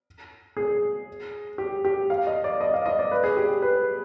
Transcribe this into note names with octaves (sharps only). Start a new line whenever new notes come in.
G#4
G4
G4
F5
D#5
D5
D#5
F5
D#5
D5
B4
G#4
G4
B4